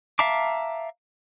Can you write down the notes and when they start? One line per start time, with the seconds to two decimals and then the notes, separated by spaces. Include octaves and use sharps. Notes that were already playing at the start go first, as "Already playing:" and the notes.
0.19 E5 F5 A5 A#5 D6